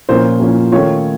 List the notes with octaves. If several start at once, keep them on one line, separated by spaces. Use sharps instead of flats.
A#2 F3 A#3 C#4 C5
A#2 F3 A#3 C#4
D#3 A3 C#4 F4 C#5